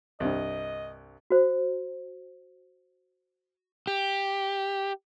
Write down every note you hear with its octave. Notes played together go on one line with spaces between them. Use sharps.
C2 G2 D#5
F#4 C5
G4